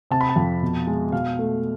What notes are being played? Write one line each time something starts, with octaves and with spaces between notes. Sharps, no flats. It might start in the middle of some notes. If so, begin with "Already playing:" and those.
C3 A5
B5
A5
F2
B2
G#3
B2 F5
A3